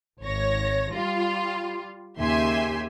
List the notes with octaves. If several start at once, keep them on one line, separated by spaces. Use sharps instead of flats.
G#1 C#5 A#6
G3 F4
D#2 C#3 G4 E5 G#5 C6